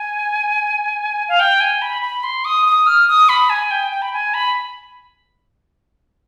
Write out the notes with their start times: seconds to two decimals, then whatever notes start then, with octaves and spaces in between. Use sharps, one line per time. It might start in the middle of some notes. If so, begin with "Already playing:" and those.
Already playing: G#5
1.29 F5
1.40 G5
1.60 G#5
1.82 B5
2.02 B5
2.24 C6
2.45 D#6
2.66 D#6
2.87 F6
3.08 D#6
3.29 B5
3.50 G#5
3.71 G5
3.91 G5
4.02 B5
4.13 G#5
4.34 B5